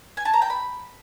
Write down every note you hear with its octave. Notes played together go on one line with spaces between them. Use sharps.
G#5
A5
A#5
G5
B5